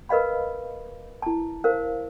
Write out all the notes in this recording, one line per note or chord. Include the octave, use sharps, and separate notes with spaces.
A#4 B4 D#5 F5 B5
E4 A5
A#4 C5 F5